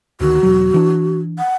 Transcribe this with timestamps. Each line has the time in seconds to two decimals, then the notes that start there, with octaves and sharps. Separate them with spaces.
0.20 D2 D#3 F#4
0.43 E1 F#3
0.74 E3 D4
1.38 F#5